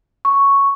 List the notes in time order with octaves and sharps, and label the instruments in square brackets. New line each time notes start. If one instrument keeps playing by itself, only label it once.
[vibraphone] C#6